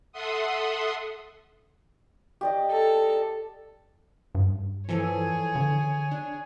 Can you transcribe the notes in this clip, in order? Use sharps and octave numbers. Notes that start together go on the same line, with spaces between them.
A4 E5 F#5 C6 D#6
G4 D5 D#5
A4
G2
E3 F3 G#4 A4 C#5
D3
D4